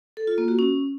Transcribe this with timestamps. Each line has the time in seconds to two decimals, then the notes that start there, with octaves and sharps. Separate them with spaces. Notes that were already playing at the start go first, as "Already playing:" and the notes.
0.17 A4
0.27 F4
0.38 A#3
0.48 F#4
0.59 C#4